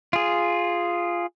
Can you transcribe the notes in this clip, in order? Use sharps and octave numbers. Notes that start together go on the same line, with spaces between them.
F4 G#4